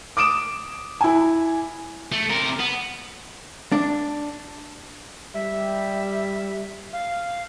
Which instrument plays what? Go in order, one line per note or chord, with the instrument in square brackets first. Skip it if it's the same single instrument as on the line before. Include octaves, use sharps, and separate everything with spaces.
[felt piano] D6 D#6 D7 E7
E4 G#5
[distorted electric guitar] A3
C3 A#4
B3
[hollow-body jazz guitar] D4
[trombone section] G3 [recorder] E5
[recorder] F5